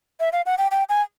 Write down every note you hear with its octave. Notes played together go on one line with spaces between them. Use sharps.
E5
F5
F#5
G5
G5
G#5